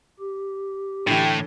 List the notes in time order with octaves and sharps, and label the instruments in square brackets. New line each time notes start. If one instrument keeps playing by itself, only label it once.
[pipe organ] G4
[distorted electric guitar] A2 [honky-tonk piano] D3 E3 [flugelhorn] G5